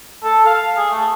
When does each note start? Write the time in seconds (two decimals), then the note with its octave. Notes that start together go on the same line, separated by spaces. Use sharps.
0.23 A4
0.46 F5
0.77 G#4
0.91 A3